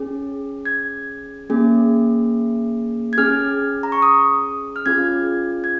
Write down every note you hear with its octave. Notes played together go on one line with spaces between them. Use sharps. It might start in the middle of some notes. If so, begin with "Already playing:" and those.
Already playing: C#4 G#4
G#6
A#3 C#4 G#4
G#6
C#4 G#4 F6
A#5
C#6
D#6
F6
C#4 F4 G#4 G#6
G#6